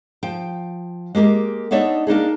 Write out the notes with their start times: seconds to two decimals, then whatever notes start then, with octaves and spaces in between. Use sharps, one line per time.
0.23 F3 G5
1.15 G#3 A#3 G4 A#4
1.71 B3 D4 D#4 C#5 D5 E5
2.07 A#3 D4 D#4 G#4